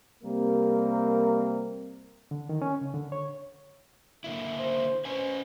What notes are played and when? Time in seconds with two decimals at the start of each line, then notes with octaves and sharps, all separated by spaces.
0.24 C3 G3 A#3 C4 A#4
2.31 D3
2.49 D#3
2.62 C#4
2.81 C#3
2.94 D3
3.12 C#5
4.24 D3 A#3 E4
4.59 C5
5.05 C#4 B4 C5 G#5